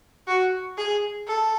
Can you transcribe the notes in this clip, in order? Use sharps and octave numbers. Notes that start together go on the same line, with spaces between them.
F#4
G#4
A4